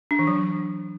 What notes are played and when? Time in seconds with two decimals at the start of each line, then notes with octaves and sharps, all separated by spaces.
0.11 D4
0.19 E3
0.27 F#3